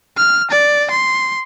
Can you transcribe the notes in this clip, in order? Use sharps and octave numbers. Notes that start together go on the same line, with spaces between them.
F6
D5
C6